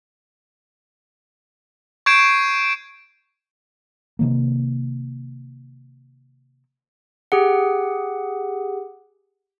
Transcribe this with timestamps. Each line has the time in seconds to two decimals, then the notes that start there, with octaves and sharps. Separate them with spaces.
2.06 C#6 G6 G#6 C7 D7 E7
4.19 C3 D#3 A#3
7.32 G4 G#4 F#5